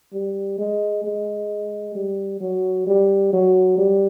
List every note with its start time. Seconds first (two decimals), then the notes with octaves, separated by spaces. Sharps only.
0.13 G3
0.58 G#3
1.04 G#3
1.95 G3
2.41 F#3
2.87 G3
3.33 F#3
3.78 G3